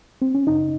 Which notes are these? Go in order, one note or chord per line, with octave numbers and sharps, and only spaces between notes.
C4
C#4
F#2 C#3 D#4